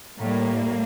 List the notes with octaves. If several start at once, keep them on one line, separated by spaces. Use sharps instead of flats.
A2 G3 A#3